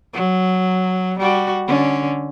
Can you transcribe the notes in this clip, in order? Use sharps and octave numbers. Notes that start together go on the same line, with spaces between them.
F#3
G3 F#4
D3 C#4